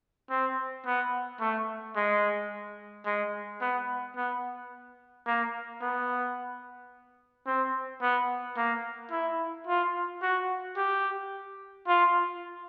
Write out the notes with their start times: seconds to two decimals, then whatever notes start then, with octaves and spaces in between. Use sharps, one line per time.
0.30 C4
0.85 B3
1.40 A3
1.95 G#3
3.06 G#3
3.61 B3
4.16 B3
5.26 A#3
5.81 B3
7.46 C4
8.02 B3
8.57 A#3
9.11 E4
9.67 F4
10.22 F#4
10.77 G4
11.87 F4